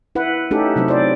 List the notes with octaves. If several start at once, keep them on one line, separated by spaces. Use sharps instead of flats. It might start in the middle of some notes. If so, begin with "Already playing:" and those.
E4 B4 F#5
A3 C#4 D#4 E4 G4 A4
C3 F#3 C4 E4
C5 D5